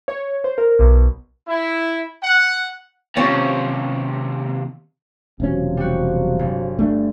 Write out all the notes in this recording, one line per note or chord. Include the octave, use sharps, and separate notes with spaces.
C#5
C5
A#4
B1
E4
F#5
D#2 C3 C4 C#4 F4
E1 C3 F3 F#3 C#4
G3 F#4
G1
A3 D4